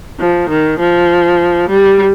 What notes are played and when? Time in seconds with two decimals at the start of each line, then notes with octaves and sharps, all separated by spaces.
0.20 F3
0.49 D#3
0.80 F3
1.69 G3